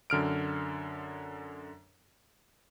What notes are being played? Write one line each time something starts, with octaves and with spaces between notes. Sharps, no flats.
F#2 D3 F6 D7